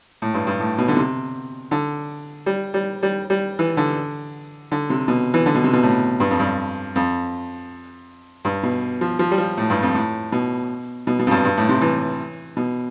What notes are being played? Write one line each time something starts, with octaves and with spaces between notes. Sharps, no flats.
A2
G2
G2
A2
B2
D3
C3
D3
G3
G3
G3
G3
E3
D3
D3
C3
B2
E3
D3
B2
C3
B2
A2
G2
F2
G2
F2
G2
B2
F3
F3
G3
F3
A2
G2
F2
A2
B2
B2
B2
F2
G2
G2
A2
C3
E3
B2